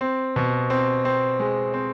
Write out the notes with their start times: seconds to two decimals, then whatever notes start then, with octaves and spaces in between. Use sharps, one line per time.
0.01 C4
0.36 B2
0.70 C4
1.05 C4
1.39 G#3
1.74 C4